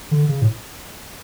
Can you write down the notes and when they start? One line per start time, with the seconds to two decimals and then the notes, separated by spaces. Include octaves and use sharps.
0.11 D3
0.29 C#3
0.42 A2